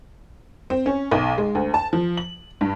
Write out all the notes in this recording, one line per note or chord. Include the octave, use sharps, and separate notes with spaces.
C4
C#4
B1
G#3
D2
A5
F3
F#7
G2